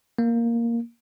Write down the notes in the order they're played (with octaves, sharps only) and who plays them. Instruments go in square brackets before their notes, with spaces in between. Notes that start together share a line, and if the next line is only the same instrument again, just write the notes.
[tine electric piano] A#3